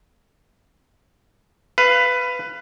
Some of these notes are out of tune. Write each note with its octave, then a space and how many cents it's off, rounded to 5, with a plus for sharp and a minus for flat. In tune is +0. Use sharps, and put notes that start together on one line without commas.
B4 +10 F5 -15